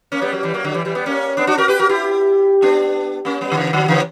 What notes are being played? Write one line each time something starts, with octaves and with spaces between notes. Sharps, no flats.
A#3 C#4
G3 B3
F#3 A#3
E3 G3
F#3 A#3
D3 F#3
E3 G3
E3 G3
G3 B3
A#3 C#4
B3 D4
D4 F#4
F#4 A#4
G4 B4
F#4 A#4
E4 G4
B3 D4
A#3 C#4
G3 B3
D3
C#3 E3
D3 F#3
C#3 E3